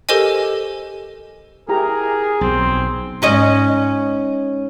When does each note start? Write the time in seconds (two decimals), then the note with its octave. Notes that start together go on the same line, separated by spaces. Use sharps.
0.09 G4 A4 A#4 C5 D#5 G#5
1.69 E4 G4 G#4 A#4 A#5
2.41 B1 C4
3.22 G#2 C#4 D#5